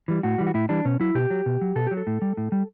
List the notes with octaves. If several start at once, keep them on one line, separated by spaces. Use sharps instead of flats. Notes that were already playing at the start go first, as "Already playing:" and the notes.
E3 G3
A2 F#4
E3 G3
F#4
A2 E4
E3 G3 D4
B2 C#4
F#3 E4
B2 G4
F#3
B2
F#3
B2 A4
F#3 G4
A4
A2
G3
A2
G3